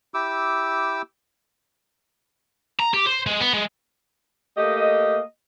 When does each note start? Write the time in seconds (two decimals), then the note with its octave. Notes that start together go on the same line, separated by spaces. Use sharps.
0.14 E4 G4 D6 E6
2.80 A#5
2.94 G4
3.07 C5
3.27 G#3
3.41 B3
3.53 G#3
4.57 A3 A#3 G4 D#5